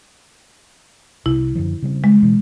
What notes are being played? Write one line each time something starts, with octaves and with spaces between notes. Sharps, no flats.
C2 C3 E4
F#2 D3 F3
C#3 G3 C4
G#3
B2 E3